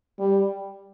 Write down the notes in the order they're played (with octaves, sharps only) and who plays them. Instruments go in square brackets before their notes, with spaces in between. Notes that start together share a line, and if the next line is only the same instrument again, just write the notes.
[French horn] G3